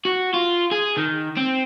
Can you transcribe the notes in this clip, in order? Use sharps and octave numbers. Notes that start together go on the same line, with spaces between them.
F#4
F4
G#4
D#3
C4